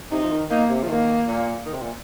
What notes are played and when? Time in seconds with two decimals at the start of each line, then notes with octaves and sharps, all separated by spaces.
0.12 C3 D#4
0.23 F3
0.32 D#3
0.50 A#3 D#4
0.69 C3
0.83 F3
0.88 D#3 A#3
1.27 A#2
1.65 D#3
1.73 C3
1.82 A#2